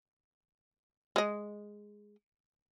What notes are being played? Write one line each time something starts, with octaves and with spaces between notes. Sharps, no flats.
G#3 D#5